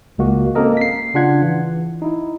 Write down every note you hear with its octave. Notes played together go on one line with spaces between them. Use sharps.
C#2 G#3 A#3 F#4
A#3 C4 C#4 A4 A#4 D#5
B6 C7
C#3 D4 F4 F#5 G#6
E3
D#4 E4